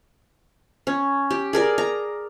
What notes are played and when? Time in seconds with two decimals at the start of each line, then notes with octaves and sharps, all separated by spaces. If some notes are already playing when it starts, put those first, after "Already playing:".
0.87 C#4
1.30 G4
1.53 G#4 A#4 D5
1.78 A#5